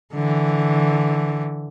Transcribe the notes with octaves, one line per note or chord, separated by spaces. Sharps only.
D3 E3